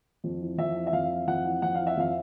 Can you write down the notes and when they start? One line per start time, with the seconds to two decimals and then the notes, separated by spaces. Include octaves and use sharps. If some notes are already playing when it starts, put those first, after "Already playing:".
0.24 F2
0.40 E3
0.58 F2 E5
0.76 E3
0.87 E5
0.93 F2 F5
1.10 E3
1.27 F2 F#5
1.45 E3
1.62 F2 F#5
1.75 E3 F5
1.87 E5
1.97 F2 F5